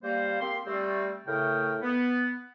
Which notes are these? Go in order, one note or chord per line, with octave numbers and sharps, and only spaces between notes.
G3 A#3 C5
A#3 C4 G4 C6
G3 A3 C4
A2 C#3 A3 A#4 G5
B3